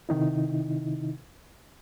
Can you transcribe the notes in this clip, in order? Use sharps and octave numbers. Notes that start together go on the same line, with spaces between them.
C3 D#3 D#4 E4